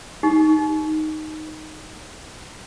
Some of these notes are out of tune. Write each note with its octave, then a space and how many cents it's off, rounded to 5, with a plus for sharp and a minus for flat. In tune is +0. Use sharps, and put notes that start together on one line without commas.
D#4 +0 G4 +0